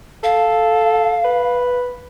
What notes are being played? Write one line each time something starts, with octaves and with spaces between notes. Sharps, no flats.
A4 F5
B4